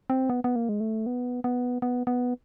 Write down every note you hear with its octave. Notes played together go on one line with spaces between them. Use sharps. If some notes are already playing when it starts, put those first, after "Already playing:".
C4
B3
B3
A#3
G#3
A3
B3
B3
B3
B3